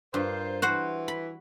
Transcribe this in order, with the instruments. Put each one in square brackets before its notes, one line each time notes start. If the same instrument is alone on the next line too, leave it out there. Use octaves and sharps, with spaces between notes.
[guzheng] G2 [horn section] F4 A#4 C5
[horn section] E3 [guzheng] F#4 C5 F#5
[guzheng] B5